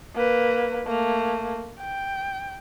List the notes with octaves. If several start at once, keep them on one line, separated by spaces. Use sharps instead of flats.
A#3 B4
A3 A#3
G5